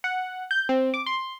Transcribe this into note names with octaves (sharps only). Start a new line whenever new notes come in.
F#5
G6
C4
D6
C6